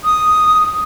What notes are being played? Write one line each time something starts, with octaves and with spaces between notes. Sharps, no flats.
D#6